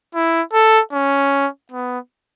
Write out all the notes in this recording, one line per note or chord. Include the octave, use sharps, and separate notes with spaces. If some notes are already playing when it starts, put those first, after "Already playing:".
E4
A4
C#4
B3